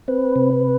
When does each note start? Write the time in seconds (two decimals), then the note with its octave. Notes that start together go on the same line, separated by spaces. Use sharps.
0.08 C4 B4
0.36 C3